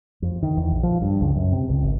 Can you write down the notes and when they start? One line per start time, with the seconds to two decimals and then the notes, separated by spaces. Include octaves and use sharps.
0.22 F2
0.43 D#3
0.57 E2
0.71 A#1
0.83 F3
1.02 G2
1.21 C#2
1.36 F#2
1.52 C3
1.69 C#2
1.83 G#1